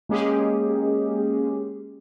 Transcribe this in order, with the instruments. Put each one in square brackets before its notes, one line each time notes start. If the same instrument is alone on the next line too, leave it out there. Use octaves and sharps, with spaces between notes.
[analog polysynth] G#3 A#3 C#4 G4 G#4